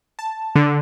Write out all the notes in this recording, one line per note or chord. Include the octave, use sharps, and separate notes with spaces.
A5
D3